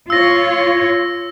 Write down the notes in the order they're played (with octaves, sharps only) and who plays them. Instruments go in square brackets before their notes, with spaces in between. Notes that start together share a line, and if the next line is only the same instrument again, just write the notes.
[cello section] F4 C#5 [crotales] E6 A#6